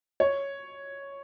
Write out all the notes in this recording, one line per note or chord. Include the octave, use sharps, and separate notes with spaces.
C#5